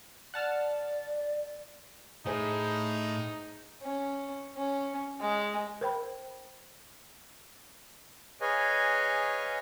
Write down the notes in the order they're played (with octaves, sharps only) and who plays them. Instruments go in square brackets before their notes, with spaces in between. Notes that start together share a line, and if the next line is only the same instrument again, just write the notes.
[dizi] D5 [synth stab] F#5 A5 F6
[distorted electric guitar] A2 [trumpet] D#4 [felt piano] G#4 C5
[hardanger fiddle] C#4
C#4
G#3
[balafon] A#4 C5 G5 B5
[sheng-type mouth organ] G#4 B4 C#5 D#5 F5 G#5